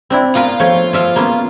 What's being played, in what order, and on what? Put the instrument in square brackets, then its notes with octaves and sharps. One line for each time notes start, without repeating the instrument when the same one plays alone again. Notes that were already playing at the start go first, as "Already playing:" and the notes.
[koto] C4 D4 E4
[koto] B3 A#4 B4 [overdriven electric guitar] F4
[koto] F3 A3 C#5
F3 E5 F5
A#3 B3 C#4